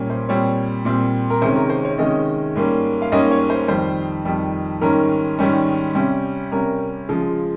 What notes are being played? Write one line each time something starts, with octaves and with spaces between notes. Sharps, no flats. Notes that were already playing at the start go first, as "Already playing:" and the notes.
Already playing: A#2 G3 A#3 C#4
C5
A#2 G3 C4 C#5
A#2 G3 C4
A#4
C3 D#3 G#3 C#4 C5
A#4
C5
C#5
C3 D#3 G#3 C#4 D#5
G#2 G3 A#3 C#4
F5
G#2 G3 A#3 C#4 D#5
C#5
C5
F2 D#3 G3 C5
F2 D#3 G3
G#2 D#3 G3 C#4 A#4
G#2 D#3 G3 C#4
C3 G3 C#4
C3 G3 C#4 A#4
C#3 F3 G#3